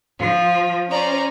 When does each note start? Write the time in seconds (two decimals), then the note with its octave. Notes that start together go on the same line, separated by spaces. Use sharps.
0.18 F3 F4
0.90 C#4 C5 D5 A#5